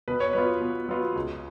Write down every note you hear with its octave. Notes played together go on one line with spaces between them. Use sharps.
B2 B4
C#5
F#3 B3 F4 B4
B2
F#3 B3 F4
C#2